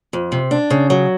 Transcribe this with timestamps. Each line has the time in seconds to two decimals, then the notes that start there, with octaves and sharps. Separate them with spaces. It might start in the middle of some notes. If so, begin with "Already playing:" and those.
0.13 F2
0.32 C3
0.51 D4
0.70 C#3
0.90 F#3